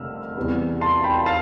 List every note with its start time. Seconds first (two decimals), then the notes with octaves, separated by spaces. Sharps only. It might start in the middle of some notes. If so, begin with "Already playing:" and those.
Already playing: F1 F2 D3 G3 E6 F6
0.36 E2 C3 E3 G3 B3
0.81 A5 C6
1.04 G5 B5
1.26 F5 A5